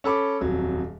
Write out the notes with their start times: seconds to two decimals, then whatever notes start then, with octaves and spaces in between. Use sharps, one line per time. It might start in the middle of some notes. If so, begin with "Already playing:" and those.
0.04 C#4 A4 B5 D6
0.41 D#1 F2 F#3